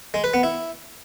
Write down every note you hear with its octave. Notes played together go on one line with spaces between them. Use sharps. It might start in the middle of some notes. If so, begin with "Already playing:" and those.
G#3
B4
B3
E4